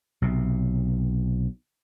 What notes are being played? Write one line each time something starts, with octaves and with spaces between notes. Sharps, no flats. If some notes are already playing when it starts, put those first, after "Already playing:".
B1 C3